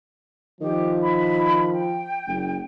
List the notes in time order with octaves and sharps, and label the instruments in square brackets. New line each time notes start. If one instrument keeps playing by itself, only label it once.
[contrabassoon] D#3 [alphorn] F3 [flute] G4
[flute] B5
G5
[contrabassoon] F#1